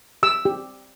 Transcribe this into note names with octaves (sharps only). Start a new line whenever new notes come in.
G4 E6
G4